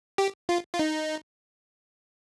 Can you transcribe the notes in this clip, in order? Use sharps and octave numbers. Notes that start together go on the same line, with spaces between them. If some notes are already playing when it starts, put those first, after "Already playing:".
G4
F4
F4
D#4